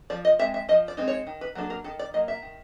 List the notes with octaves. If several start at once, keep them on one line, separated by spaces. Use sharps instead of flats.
F3 D5
D#5
G#3 C4 E5
E5
F3 D#5
D5
G#3 C4 D#4
C#5
D#3
B4
F#3 A#3 D4 A4
A#4
D#3 A4
D5
F#3 A#3 D#5
E5
D#3